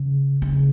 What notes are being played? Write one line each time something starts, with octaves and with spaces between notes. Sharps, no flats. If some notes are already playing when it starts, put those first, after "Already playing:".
Already playing: C#3
C#3